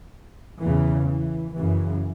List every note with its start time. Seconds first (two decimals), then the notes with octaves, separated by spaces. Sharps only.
0.62 E2 C#3 E3
1.09 E3
1.57 F#2 C#3 E3